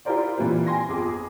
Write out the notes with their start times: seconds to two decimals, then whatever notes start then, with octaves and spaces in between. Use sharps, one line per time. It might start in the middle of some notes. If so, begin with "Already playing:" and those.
0.05 E4 F4 G4 A#4 C5 D5
0.38 A#2 E3 G3 A#3 C4
0.67 G5 G#5 C6 A#6
0.88 G1 F2 F3 G#4 D6